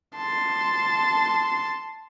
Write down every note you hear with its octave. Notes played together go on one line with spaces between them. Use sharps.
A5 C6